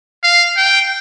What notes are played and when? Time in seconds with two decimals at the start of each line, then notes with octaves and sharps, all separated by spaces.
0.23 F5
0.57 G5